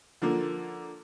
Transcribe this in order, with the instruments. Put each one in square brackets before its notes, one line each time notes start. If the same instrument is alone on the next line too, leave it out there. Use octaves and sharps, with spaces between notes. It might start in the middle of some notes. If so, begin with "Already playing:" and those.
[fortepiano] D3 F3 A#3